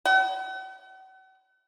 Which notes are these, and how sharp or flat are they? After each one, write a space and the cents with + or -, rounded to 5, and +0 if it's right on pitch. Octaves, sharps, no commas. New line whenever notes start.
F#5 +40